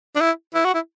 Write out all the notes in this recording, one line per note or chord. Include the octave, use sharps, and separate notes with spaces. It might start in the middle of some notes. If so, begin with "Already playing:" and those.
D4
E4
E4
F#4
E4